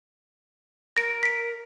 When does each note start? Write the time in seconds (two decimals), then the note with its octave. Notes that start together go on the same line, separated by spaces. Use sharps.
0.97 A#4 A#6 D7
1.23 B6 D7